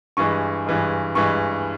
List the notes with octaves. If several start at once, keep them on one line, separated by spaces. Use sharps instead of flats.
G2 E3 G#3 C#6
G2 E3 G#3
G2 E3 G#3 C#6